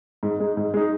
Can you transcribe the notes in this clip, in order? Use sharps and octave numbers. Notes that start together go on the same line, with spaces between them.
G#2
G#3 D#4
G#2
G#3 D#4